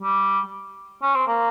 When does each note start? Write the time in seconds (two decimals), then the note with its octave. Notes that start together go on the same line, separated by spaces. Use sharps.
0.01 G3
1.02 C#4
1.15 C4
1.27 A#3